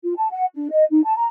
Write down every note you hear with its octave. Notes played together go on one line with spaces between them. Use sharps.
F4
A5
F#5
D4
D#5
D#4
A5
A#5